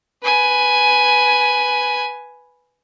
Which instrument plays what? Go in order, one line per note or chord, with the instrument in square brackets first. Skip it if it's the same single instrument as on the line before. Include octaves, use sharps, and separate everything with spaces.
[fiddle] B4 G#5